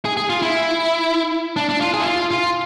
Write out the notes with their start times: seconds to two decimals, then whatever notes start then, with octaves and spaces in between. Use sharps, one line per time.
0.05 G#4
0.17 G#4
0.30 F4
0.42 E4
1.56 D4
1.69 D4
1.81 F4
1.94 G#4
2.01 E4
2.06 F4
2.31 F4